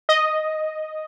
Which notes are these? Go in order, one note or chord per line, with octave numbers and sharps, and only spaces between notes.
D#5